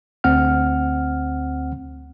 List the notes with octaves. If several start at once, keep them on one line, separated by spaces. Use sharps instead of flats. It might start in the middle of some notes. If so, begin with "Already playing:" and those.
D2 C4 F#5 F6